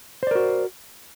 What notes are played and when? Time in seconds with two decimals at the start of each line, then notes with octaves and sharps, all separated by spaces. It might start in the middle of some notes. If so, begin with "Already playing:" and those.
0.23 C5
0.27 D5
0.31 A#4
0.35 F#4